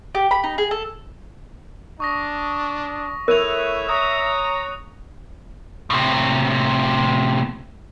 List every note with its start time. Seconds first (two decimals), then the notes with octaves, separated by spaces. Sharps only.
0.15 G4
0.31 B5
0.44 D#4
0.58 G#4
0.71 A4
2.00 D4 C#6 D#6 A#6
3.28 A3 E4 A#4 C#5 E5 F#6 D#7 F7
3.89 C#5 A#5 D#6
5.90 A2 C3